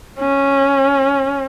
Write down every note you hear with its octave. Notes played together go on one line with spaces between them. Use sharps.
C#4